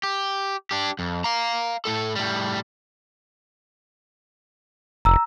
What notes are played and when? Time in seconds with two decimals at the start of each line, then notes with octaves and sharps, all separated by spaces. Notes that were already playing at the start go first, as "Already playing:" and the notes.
0.03 G4
0.71 D4 G4
0.99 F2
1.24 F5 A#5
1.85 A2 A4
2.15 A2 G3
5.05 F1 A#5 E6